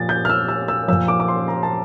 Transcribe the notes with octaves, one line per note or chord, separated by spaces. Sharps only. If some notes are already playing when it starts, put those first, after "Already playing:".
Already playing: A#2 F3 A6
G6
F6
E6
E6
E6
A#2 F3 E6
D6
D6
C6
A#5
A5